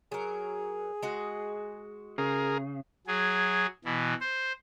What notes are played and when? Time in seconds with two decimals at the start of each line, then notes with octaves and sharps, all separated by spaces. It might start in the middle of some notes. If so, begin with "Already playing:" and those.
0.12 F#3 G#4 A#4
1.03 G#3 F#4
2.18 C#3 G#4 A#4
3.07 F#3 G#4
3.85 B2 E3
4.21 C5